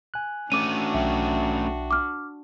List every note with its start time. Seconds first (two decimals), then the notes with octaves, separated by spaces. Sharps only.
0.14 G#5 F#6
0.52 A3 C#4 D4 F#4 D6 D#7
0.94 B1 E5 G5
1.91 D6 F6